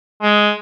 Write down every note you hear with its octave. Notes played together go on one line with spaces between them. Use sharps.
G#3